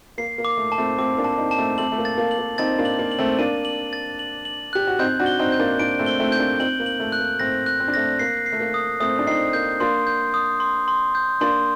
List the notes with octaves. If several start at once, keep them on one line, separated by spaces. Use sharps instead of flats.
A#3 C7
A#3
D6
A3
A5
A3 C4
A3 C4 D6
A#3 D4
A5
C4 D#4
A5
A3 C4
A3 C4 F#7
A3
A#3
A6
A#3
F#7
A#3
C4 D#4 A6
A#3 D4
F#7
A#3
F#7
A3 C4
A#3 D4 D#7
F#7
A6
F#7
F#7
G4 F#6
F#4
C4 D#4 G6
D4 F#4
G7
C4 D#4
G6
A#3 D4
A#3 D4 D7
A3 C4
G7
A3 C4
G6
A#3 D4
C4 D#4 F#7
A#3
F#7
A3
F#6
A#3
A3 C4 A#6
F#6
C4
D4
A3 C4 A#6
A#3 C7
C7
A3
A#3
D#6
A3 C4 D#6
D4
C4 D#4 C7
A#3 G6
A#3 D4 C6
G6
D#6
C6
C6
G6
A#3 D4 C6